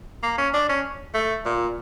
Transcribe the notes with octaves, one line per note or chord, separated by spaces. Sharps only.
A#3
C#4
D4
C#4
A3
A#2